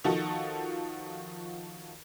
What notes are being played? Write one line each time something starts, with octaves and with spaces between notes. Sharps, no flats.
D#3 F3 F#4 A4